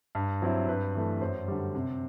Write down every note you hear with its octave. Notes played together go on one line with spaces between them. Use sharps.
G2
F#3 C4 E4
G2 B4
E3 A3
F#2 C5
D3 G3
C3